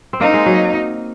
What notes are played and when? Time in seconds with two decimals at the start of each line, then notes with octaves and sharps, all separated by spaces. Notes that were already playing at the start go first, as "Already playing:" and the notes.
0.13 C4
0.20 A#3 D#4
0.34 G#3
0.46 F#3